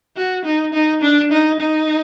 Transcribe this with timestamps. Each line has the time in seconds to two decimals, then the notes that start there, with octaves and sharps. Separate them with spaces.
0.17 F#4
0.45 D#4
0.73 D#4
1.02 D4
1.31 D#4
1.60 D#4